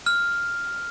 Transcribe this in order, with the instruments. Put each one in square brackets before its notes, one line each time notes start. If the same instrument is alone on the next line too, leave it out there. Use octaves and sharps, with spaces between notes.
[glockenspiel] F6